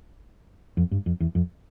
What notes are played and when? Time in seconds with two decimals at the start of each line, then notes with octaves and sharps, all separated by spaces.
0.77 F2
0.91 G2
1.06 F2
1.20 E2
1.35 F2